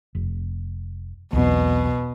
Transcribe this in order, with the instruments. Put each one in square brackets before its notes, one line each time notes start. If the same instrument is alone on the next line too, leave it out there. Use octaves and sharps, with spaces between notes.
[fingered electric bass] F1
[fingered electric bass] B1 E2 C4 [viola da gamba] B2